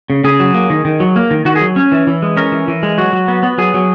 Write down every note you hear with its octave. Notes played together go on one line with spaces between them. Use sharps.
C#3
C#3 G#4
F#3
A#3
D#3
D#3
F#3
A#3
D#3
D#3 F#4
G#4
F#3
C#4
E3
E3
G#3
C#4 A#4
E3
E3
G#3
F#3 F#4
F#3
B3
B3
F#3 G#4
F#3